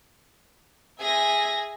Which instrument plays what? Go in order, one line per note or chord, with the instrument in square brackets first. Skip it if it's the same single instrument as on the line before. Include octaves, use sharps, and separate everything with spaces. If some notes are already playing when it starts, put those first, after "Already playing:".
[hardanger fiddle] G#4 G#5 [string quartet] E5 A#6